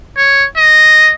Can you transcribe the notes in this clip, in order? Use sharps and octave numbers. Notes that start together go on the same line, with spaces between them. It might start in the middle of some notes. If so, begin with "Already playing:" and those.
C#5
D#5